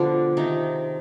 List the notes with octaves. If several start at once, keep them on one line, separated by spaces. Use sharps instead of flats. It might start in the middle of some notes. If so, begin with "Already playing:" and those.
Already playing: B2 D3 F3 G3 B3 D4 F4
C3 D#3 F3 G#3 D#4